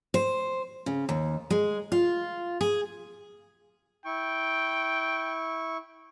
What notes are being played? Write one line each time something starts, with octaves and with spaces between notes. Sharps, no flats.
C5
C#3
D#2
G#3
F4
G#4
E4 G5 C#6